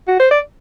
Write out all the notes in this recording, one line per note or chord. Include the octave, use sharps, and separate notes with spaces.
F#4
C5
D5